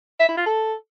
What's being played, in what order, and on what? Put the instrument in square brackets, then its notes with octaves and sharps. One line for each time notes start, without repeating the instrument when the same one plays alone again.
[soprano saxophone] E5
E4
F4
A4